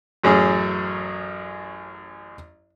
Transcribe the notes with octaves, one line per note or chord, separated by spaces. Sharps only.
A1 F#2 C#4 G#4